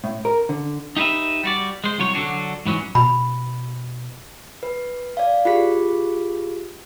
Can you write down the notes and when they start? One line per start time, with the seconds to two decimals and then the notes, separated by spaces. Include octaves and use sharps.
0.04 A2
0.25 A#4
0.49 D3
0.97 D#4 G4 G#4 B4 E5
1.44 G3 F#4 D5
1.84 G#3 C5
1.98 C2 F#3 C#5
2.14 D3 F#3 D4 F#4
2.66 G#2 E3 F#3 C#4
2.95 B2 B5
4.63 B4
5.17 D5 F5
5.45 F4 G4 G#4 B6